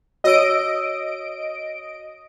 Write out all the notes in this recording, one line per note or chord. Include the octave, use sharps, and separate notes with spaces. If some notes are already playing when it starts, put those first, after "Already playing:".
F#4 C#5 D#5 E6 D7